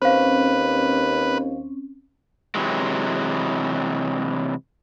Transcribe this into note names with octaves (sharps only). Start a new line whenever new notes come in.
D#2 C4 C#4 B4 C5 F5
C3 E3 F#3 G#3